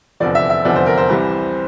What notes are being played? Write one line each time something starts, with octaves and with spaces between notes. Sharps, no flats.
F1 E2 D3 F3 D5
E5
E5
F1 E2 D3 F3 D5
C5
A#4
C5
C2 C3 E3 G3